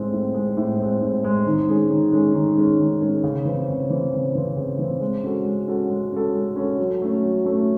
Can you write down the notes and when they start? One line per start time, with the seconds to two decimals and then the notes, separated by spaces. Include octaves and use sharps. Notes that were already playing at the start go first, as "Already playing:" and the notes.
Already playing: A2 G#3 C4
0.12 A2
0.34 G#3 C4
0.57 A2
0.80 G#3 C4
1.01 A2
1.24 G#3 C4
1.46 D#3
1.69 G#3 C#4 G#4
1.90 D#3
2.12 G#3 C#4 G#4
2.35 D#3
2.57 G#3 C#4 G#4
2.80 D#3
3.01 G#3 C#4 G#4
3.23 C#3
3.45 E3 C4
3.68 C#3
3.90 E3 C4
4.13 C#3
4.35 E3 C4
4.56 C#3
4.79 E3 C4
5.01 G#3
5.23 C#4 F#4 A4
5.45 G#3
5.68 C#4 F#4 A4
5.90 G#3
6.12 C#4 F#4 A4
6.34 G#3
6.56 C#4 F#4 A4
6.79 F#3
7.02 A3 C#4
7.23 F#3
7.45 A3 C#4